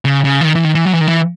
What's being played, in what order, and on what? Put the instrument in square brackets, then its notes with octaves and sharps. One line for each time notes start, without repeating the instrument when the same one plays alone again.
[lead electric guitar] C#3
C#3
E3
D#3
E3
D#3
E3
F#3
E3
D#3
E3